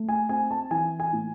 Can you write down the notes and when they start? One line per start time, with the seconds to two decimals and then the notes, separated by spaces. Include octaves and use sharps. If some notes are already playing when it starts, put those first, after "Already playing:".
Already playing: A3
0.09 G#5
0.29 C4 G#5
0.51 A5
0.71 E3 G#5
1.00 G#5
1.13 A2